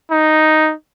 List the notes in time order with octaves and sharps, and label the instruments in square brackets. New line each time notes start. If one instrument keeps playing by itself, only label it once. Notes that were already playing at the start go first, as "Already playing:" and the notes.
[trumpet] D#4